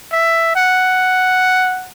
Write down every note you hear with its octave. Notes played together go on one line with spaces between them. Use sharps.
E5
F#5